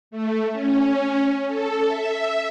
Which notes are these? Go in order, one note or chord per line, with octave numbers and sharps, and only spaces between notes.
A3
C#4
A4
E5